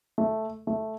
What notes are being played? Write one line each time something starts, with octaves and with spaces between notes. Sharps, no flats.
A3
A3